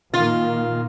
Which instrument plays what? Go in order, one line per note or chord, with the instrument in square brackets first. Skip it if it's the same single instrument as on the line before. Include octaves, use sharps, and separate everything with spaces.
[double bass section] A#2 D#3 A#3 [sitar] F4